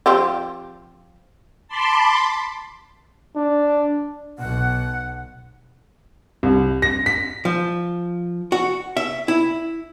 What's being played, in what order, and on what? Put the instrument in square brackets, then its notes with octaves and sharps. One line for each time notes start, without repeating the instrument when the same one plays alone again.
[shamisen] F3 C4 G4
[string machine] A5 B5 C6 D6
[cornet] D4
[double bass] B1 [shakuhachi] F#5
[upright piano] C2
A#6
B6
[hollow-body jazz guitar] F3
F#4
E5
E4